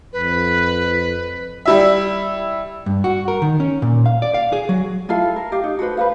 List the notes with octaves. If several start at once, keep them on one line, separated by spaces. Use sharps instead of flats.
F2 B4
G3 E4 E5
G2
F#4
A#4
D#3
C#4
A#2
F5
D5
F5
G#4
F#3
E4 F4 A4 F5
A#4
G4 F5
D#4
F#4 A4 B4 C5
B4 C5 F5